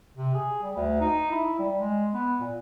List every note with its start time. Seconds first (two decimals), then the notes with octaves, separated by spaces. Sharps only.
0.17 C3
0.35 G#4
0.62 G3
0.76 D2
1.01 D#4
1.31 E4
1.59 G3
1.80 G#3
2.14 B3
2.40 A#2